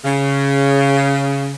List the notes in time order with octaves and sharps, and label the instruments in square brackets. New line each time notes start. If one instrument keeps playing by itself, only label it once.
[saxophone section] C#3